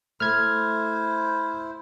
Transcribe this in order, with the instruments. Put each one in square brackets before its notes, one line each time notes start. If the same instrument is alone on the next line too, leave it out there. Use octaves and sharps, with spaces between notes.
[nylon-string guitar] A3 [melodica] E4 C5 [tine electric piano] F6 G#6